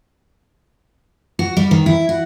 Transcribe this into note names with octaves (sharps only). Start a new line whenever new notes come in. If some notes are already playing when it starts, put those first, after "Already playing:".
F#4
G3
D#3
E4
F#4